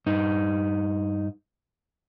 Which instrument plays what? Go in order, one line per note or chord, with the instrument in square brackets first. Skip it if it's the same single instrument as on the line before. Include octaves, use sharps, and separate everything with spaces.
[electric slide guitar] G2 D#4